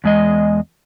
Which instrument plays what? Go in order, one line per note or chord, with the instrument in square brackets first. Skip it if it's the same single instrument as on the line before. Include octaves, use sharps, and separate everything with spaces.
[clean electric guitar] E2 G#3 D#5